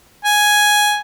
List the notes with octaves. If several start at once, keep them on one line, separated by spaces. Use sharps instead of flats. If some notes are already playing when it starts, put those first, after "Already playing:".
G#5